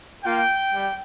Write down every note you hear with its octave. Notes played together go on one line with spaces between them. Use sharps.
A#3 F4 G5
G3